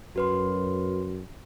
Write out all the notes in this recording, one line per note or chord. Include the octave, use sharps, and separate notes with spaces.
F#2 F#4 B4 C6